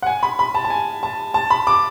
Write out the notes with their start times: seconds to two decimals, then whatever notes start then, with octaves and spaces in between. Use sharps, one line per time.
0.02 F#5
0.07 G#5
0.23 B5
0.39 B5
0.55 A5
0.65 A5
0.70 G#5
1.03 A5
1.34 A5
1.50 B5
1.67 D6